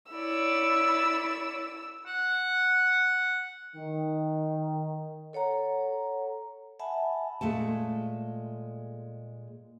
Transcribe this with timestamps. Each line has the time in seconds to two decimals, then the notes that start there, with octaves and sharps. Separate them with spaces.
0.12 E4 C#5 D5 E6
2.07 F#5
3.76 D#3
5.33 A4 C#5 F#5 A#5
6.79 E5 F#5 G#5 A5 B5
7.41 A#2 G#3 A3 A5